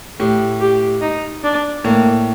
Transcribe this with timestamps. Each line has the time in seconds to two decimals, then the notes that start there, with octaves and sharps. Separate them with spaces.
0.20 A2 G4
0.60 G4
1.01 D#4
1.44 D4
1.84 A2 A#3